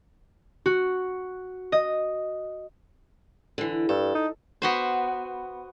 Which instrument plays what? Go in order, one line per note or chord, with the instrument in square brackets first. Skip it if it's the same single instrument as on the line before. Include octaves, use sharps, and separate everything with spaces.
[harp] F#4
D#5
[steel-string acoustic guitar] D3 E3
[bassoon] G2 [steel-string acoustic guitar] A4
[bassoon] D#4
[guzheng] B3 F#4 C5